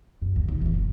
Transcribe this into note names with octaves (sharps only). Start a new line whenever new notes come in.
F#2
D2
D#2 A#2
F#1 E3
G1